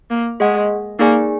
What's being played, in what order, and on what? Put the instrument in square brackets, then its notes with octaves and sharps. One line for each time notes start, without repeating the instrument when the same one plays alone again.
[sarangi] A#3
[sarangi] G#3 [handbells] G#4 D#5 F#5
[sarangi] A#3 [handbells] D#4 G#4 D5 G#5